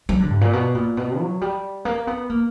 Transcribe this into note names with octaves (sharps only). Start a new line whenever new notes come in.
F#3
D3
G2
A#2
B2
A#2
B2
F#3
G3
A#3
B3
A#3